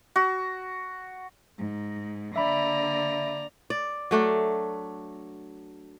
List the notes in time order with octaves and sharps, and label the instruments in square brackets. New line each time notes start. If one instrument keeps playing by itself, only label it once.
[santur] F#4
[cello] G#2
[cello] D3 A#3 [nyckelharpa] D5 A#5 [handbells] E5 B5
[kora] D5
F#3 A3 D4